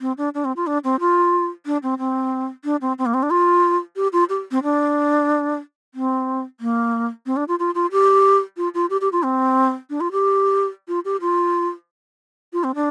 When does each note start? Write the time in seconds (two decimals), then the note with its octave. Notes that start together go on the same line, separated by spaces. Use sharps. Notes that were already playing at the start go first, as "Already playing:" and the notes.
0.01 C4
0.18 D4
0.34 D4
0.45 C4
0.56 F4
0.67 D4
0.84 C4
1.00 F4
1.66 D4
1.83 C4
1.98 C4
2.65 D4
2.81 C4
2.98 C4
3.06 A#3
3.14 C4
3.23 D4
3.31 F4
3.96 G4
4.13 F4
4.29 G4
4.51 C4
4.63 D4
5.95 C4
6.60 A#3
7.26 C4
7.37 D4
7.48 F4
7.59 F4
7.75 F4
7.92 G4
8.57 F4
8.74 F4
8.90 G4
9.01 G4
9.12 F4
9.23 C4
9.90 D4
10.01 F4
10.12 G4
10.88 F4
11.05 G4
11.21 F4
12.53 F4
12.64 C4
12.75 D4